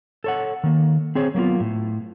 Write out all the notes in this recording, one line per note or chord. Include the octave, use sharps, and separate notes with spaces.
A4 C#5 F#5
D#3 A#3
C4 G#4 C5 C#5
F#3 A#3 B3 F4
A2